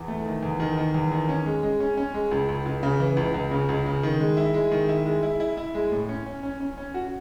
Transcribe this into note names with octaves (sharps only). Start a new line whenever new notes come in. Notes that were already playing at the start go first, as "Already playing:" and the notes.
Already playing: E2
A3
D#3
E2
D#3
D#3
E2
D#3
C#4
G#3
G#3
C#4
C#4
G#3
C#2
C#2
C#2
C#3
E3
C#2
C#2
C#3
C#2
C#3
D#3
G#3
E4
G#3
D#3
E4
G#3
E4
E4
E4
G#3
A2
C#4
C#4
C#4
C#4
C#4
F#4